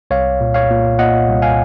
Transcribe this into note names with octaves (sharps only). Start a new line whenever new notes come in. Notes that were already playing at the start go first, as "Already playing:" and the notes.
C2 C#5 F5
A#2
C#5 F5
A#2
A#2 D#5 F#5
C2
F5 G#5